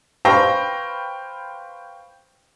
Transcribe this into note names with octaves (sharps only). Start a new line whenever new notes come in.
B4 C5 F5 G5 C#6 A#6